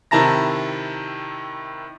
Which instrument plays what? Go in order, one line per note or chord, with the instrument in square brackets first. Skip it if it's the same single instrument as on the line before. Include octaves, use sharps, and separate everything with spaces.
[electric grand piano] C3 D#3 E4 A5 A#5 A#6